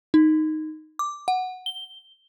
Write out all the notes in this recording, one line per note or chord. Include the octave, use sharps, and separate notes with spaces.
D#4
D6
F#5
G7